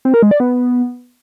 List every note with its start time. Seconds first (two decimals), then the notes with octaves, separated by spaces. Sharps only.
0.05 C4
0.14 A#4
0.23 G#3
0.31 D5
0.40 B3